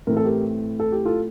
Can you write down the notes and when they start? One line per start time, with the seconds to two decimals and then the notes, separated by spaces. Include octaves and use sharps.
0.07 A2 E3 A3 C4 A#4
0.17 A4
0.25 G4 A#4
0.80 A4
0.92 G4
1.05 F4 A4